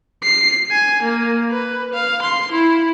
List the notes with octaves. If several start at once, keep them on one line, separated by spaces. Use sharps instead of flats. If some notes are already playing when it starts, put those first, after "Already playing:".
C7
G#5
A#3
B4
F5
C6
E4